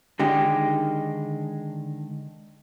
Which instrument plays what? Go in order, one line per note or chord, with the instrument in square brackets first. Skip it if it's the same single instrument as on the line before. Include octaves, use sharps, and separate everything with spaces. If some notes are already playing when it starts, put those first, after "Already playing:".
[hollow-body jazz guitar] D3 D#3 G#3 D#4 G4